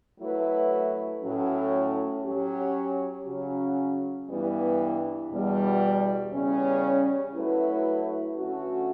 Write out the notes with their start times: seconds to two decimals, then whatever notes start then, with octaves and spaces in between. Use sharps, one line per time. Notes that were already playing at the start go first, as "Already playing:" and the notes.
0.20 F#3 A3 E4 B4
1.21 A2 F#3 C#4
2.24 F#3 C#4 G4
3.25 C#3 F#3 C#4
4.28 G2 E3 G3 B3
5.30 E2 B2 G3
6.32 E2 C#3 G3 C#4
7.34 F#3 A3 E4 B4
8.36 D3 A3 C#4 F#4